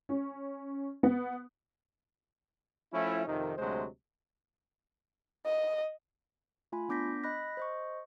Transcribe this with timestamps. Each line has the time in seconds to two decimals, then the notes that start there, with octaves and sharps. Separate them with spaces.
0.09 C#4
1.03 B3
2.93 F3 A3 C#4 E4
3.26 F2 C3 D#3
3.57 D2 C3 F#3 G#3 C5
5.46 D#5
6.72 A3 F4 G#5 B5
6.89 B3 D4 D6 G6 A#6 B6
7.23 D#5 B5 F#6 A#6 B6
7.57 C5 D#5 C#6